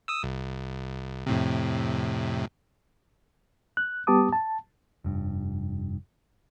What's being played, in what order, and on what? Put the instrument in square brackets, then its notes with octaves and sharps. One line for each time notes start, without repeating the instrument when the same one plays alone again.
[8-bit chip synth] D#6 E6
C2
F2 A2 C3
[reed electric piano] F#6
G3 B3 G4 A5 D6 D#6
A5
[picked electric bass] F1 G2